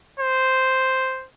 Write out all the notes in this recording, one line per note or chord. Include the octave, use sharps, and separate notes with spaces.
C5